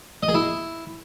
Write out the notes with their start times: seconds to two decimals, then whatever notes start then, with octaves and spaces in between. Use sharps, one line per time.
0.23 D#5
0.29 G#4
0.34 E4